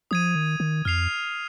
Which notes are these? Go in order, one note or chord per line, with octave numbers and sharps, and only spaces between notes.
F3 D#6 G#6 D#7
D#3
D#3
F2 F6 C7 F7